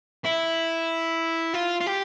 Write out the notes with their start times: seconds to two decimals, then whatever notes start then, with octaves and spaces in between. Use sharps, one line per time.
0.24 E4
1.54 F4
1.81 F4
1.86 G4